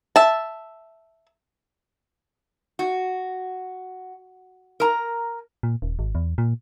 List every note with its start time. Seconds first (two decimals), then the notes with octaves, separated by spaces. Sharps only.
0.16 E5 A5
2.79 F#4
4.80 A#4 A#5
5.63 A#2
5.82 D#1
5.99 G#1
6.15 E2
6.38 A#2